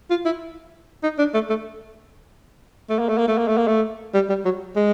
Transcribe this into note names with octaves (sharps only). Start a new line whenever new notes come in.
F4
E4
D#4
D4
A3
A3
A3
A#3
A3
A#3
A3
A#3
A3
A#3
A3
G3
G3
F#3
G#3